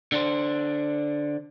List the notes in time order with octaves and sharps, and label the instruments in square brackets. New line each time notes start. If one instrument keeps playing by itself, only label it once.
[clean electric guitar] D3 D4 C5